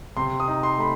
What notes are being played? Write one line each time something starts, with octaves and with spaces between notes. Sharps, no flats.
C3 C6
D#6
D#4
C6
A3 B5